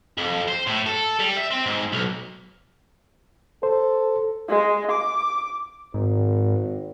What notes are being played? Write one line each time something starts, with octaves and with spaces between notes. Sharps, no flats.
F2
C5
A2
A4
G3
E5
C4
G#2
B1
A4 C5
G#3
D6
G#1 G#2